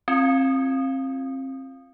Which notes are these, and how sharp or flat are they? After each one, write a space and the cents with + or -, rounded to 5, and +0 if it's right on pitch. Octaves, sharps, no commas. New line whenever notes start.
C4 +30 F4 -15